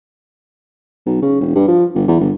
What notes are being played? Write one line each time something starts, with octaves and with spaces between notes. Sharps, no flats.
B1
C#3
E1
G2
F3
G1
E2
G1